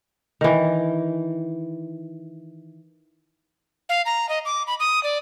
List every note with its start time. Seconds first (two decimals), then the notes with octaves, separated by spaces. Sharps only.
0.41 D#3 E3
3.89 F5
4.06 A#5
4.29 D#5
4.45 D6
4.67 B5
4.80 D#6
5.03 D5